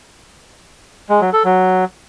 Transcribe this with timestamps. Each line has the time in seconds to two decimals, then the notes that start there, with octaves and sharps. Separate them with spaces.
1.09 G#3
1.21 F#3
1.33 A4
1.45 F#3